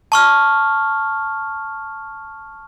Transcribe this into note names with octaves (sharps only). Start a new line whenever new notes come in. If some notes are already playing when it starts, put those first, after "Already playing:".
A5 C#6 F6